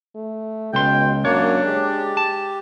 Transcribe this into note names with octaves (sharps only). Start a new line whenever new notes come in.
A3
C#2 B2 G5 C6
F#2 A#3 D4 C#5
G#3 G4
A5